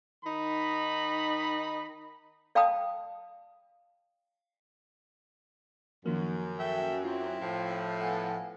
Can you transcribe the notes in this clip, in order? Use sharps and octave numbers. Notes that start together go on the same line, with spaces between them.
D#3 D#4 B5
D5 F5 G5 A5 B5 D#6
F#2 D#3 F3 A#3
A4 E5 G5
C4 E4 F4
A2 F3
B3 A4 F5 F#5 G#5